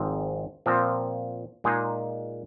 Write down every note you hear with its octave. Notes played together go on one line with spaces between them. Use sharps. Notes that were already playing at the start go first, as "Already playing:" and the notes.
Already playing: G#1 G#2 F3 C4
A#2 F3 C4
A#2 G#3 D#4 G#4